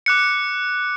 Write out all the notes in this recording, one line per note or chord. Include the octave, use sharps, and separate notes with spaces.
D6 F#6 C#7